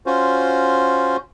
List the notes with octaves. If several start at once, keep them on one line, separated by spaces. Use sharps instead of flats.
C#4 F4 F#4 C5